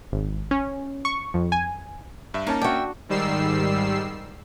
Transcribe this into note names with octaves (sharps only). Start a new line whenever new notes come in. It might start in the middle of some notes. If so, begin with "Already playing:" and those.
G#1
C#4
C#6
F2
G#5
G2 E5
A#3 C#4 D#4 A5
D4 F#4 E5 G5
G#2 D#3 G3 E6 C7